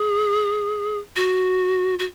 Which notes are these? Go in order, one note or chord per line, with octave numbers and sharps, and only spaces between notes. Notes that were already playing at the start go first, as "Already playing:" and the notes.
Already playing: G#4
F#4
F#4